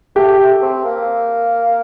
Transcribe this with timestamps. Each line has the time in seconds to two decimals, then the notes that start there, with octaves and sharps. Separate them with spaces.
0.16 A3 G4
0.38 A3
0.62 C4
0.84 A#3